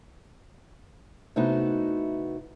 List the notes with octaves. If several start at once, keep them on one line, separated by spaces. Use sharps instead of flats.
C3 A3 B3 D#4 E4 F#4